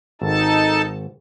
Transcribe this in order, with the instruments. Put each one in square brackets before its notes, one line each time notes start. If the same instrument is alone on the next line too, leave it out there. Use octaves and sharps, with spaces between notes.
[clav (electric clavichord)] G#1 [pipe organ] D#4 A4 A5